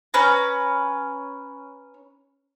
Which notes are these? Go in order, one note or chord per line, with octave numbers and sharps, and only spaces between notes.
C#4 B4 A#5